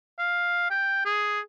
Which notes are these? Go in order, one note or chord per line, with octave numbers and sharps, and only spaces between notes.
F5
G5
G#4